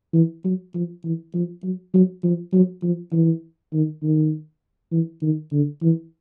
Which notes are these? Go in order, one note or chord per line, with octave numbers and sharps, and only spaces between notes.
E3
F#3
F3
E3
F3
F#3
F#3
F3
F#3
F3
E3
D#3
D#3
E3
D#3
D3
E3